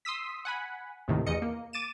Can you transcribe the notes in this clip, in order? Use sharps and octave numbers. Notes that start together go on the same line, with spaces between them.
C6 D#6 E6 B6
F#5 G#5 B5
D#2 A2 C3 D#3
A1 E2 D#5 C#7
A#3
D6 A6 D#7 E7